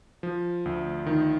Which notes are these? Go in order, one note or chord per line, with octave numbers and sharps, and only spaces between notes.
F3
D2
D#3